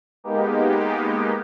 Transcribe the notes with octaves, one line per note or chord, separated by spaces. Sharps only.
G#3 A#3 B3 D#4 G4